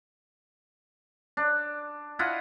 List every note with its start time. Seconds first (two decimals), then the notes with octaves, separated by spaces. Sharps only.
1.37 D4
2.19 E4 F4 D#5 F#5